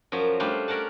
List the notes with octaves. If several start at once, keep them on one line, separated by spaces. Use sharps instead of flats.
F#2 F3 F#3 A#5
G3 A3 D4 C5 F5
C#4 A#4 D5 F#5 A5